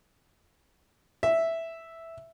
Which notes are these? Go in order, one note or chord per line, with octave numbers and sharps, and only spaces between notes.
E5